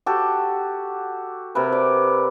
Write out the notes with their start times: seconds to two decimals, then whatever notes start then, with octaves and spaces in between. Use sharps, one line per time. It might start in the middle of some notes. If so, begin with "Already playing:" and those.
0.06 F#4 G4 A4
1.55 C3 A#4 B4
1.72 D5